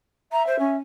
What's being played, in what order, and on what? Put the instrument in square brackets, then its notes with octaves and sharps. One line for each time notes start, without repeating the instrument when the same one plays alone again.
[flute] E5 [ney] A#5
[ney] C5
C#4